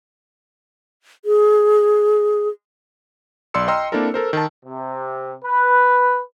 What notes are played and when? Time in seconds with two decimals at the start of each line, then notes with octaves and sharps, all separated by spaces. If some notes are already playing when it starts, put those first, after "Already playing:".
1.25 G#4
3.54 B1 D5 C6 E6 C#7
3.68 D#5 G5 A#5 C6 E6 F6
3.92 A#3 C4 D4 E4 A4 A#4
4.14 A4 A#4 C5
4.33 D#3 A5
4.65 C3
5.45 B4